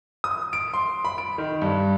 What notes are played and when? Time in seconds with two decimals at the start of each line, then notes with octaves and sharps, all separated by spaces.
0.24 D#6
0.53 D7
0.74 C6
1.05 B5
1.18 D7
1.38 D#3
1.62 G2